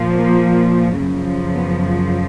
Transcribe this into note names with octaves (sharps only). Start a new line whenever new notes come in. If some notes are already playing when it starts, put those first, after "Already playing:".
Already playing: A#2 F3
A#3
F#2 C#3 F3
B3